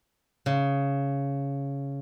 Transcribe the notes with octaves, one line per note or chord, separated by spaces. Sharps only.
C#3